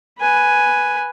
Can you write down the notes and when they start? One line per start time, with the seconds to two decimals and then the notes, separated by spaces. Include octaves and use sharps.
0.19 B4 G#5